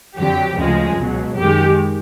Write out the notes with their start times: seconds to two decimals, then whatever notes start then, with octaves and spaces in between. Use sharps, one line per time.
0.18 F2 D3 F#3 G4
0.58 D2 C#3 F3 G#3
0.98 C#2 B2 F#3
1.38 F#2 D#3 G#3 G4